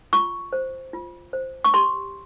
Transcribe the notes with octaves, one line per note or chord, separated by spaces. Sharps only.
F4 C#6
C5
F4
C5
C#6
G4 C6